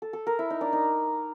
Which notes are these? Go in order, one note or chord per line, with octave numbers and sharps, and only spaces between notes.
A4
A4
A#4
E4
D#4
D4
D#4